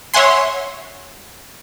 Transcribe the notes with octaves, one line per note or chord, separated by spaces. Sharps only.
C#5 E5 F#5 G#5 C6